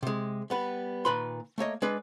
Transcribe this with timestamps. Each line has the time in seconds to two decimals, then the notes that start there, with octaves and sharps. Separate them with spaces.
0.03 C3 G#3
0.50 G3 B3 B4
1.05 A#2 D#3 B4 B5 C6
1.58 A3 A#3 C#5 D#5
1.82 G#3 D4 B4 D5